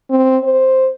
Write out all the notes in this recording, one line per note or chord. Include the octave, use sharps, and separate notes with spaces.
C4
C5